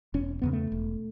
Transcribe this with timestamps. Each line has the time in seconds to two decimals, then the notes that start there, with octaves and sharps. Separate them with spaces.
0.14 E1 C#4
0.42 E2 C#3 B3
0.53 A3
0.72 E1